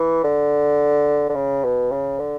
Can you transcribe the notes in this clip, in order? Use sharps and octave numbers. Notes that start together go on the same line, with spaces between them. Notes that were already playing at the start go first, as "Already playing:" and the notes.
Already playing: E3
D3
D3
C#3
B2
C#3
D3